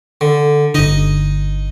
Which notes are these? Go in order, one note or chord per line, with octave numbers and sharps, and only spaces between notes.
D3
G1 D3 D#4 D#5